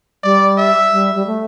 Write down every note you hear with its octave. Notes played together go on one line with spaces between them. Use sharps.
G3 D5
E5
G3
G3
A3